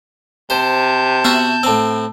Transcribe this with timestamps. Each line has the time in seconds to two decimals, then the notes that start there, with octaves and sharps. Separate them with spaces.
0.50 C3 C5 A5 G6
1.25 B3 F#4 E5 F#5
1.63 A2 C4 A5 E6